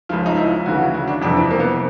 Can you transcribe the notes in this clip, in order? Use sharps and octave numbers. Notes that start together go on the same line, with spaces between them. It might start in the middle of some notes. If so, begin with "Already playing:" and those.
C#2 C#3 F3 F4
D#4
E4
D2 C#3 E3 F#4
F#4
D4
F2 C3 E3 D4
C4
A#3
B3
C4